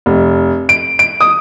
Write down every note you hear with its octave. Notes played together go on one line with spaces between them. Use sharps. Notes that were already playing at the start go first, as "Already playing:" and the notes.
F1
D7
D7
D#6